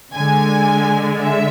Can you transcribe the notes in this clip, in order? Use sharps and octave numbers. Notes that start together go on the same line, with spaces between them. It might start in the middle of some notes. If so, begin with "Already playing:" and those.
D3 G#3 G#5
E5